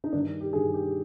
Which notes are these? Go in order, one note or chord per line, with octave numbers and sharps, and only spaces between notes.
D#4
G2 D#3 D4
G4
G2 D#3 G#4
G4